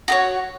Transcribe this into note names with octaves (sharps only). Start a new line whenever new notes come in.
F#4 A4 C#5